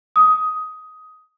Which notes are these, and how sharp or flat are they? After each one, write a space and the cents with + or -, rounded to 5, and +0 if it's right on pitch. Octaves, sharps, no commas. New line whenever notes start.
D#6 +10